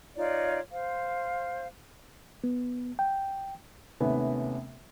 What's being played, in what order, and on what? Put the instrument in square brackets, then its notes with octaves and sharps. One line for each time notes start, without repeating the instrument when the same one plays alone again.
[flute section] D#4 F4 C#5 D5
C5 F5
[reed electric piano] B3
G5
[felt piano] D#2 C3 A3 B3 C#4